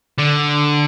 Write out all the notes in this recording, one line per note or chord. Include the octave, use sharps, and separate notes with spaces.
D3